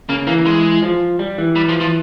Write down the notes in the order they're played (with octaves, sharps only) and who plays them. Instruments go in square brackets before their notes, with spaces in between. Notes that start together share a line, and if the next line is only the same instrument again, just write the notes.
[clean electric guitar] C#3 [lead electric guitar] A#3
[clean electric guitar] E3 [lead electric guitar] A#3
[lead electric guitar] G#3
[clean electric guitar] F3
G3
E3
[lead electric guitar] G3
F3
F3